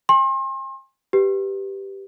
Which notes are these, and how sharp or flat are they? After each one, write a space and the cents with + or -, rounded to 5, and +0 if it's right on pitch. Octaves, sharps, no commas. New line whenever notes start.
G#5 -35 C6 +35
G4 -5 B4 +0